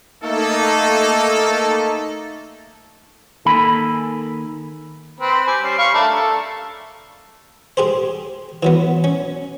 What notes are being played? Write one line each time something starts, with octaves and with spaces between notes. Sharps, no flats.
A3 A#3 D#4 A4
D#3 A#3 A4 G#5 B5
C4 B4 B5
G4 G#5
G3 C#4 C5
F5 B5 C#6
A3 D4 A#4
A4
G4 G#4 C5
E3 F#3 B3
C#4